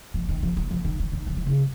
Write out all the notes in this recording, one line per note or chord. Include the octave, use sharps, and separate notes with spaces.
F3
D#3
F3
F#3
F3
D#3
D3
D#3
E3
F#3
C#3